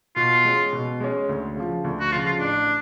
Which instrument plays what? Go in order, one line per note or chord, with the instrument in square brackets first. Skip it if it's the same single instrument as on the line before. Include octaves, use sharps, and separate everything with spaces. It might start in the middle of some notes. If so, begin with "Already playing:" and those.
[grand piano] B2 [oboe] F4
[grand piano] G#3 C#4
B2
G#3 C#4
D2
C#3 F3
D2
[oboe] F#4
[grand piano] C#3 F3 [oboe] F4
[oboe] F4
[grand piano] A1 [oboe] D4